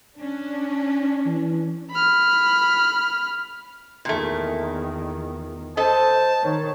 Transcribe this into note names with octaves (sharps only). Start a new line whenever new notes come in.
C#4 D4
E3
B5 F6
E2 A#2 D#3 A3
A4 C5 D#5 A5
D#3 C#5